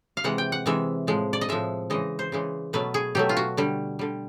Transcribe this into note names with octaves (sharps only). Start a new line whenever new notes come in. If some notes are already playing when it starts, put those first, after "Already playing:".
F5
C3 E3 G#3 F#5
G5
F#5
C3 E3 G#3 E5
A2 F3 G#3
D5
D#5
A2 F3 G#3 E5
C#3 E3 G#3 D#5
C5
C#3 E3 G#3
B2 F#3 A3 B4
G#4
B2 F#3 A3 G4
F4
F#4
D3 G3
D3 G3